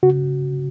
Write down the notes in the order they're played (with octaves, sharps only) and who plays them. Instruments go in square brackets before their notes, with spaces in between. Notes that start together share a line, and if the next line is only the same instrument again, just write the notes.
[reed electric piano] C#3 F#4